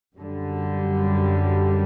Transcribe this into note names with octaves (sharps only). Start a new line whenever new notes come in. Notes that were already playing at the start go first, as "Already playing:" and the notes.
F#2 D3 G3